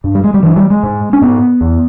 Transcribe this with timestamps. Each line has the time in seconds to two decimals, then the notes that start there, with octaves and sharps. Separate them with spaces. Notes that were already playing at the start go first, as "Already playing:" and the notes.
0.04 G2
0.15 G3
0.24 G#3
0.34 G3
0.43 G2 E3
0.56 G3
0.70 G#3
0.83 G#2
1.13 C#4
1.22 G#2 B3
1.61 E2